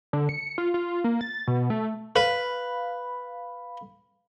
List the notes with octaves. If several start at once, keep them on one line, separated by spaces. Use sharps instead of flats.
D3
C#7
F4
F4
A#3
A6
B2
A3
B4 F5 B5